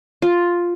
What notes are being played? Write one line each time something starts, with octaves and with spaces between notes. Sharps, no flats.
F4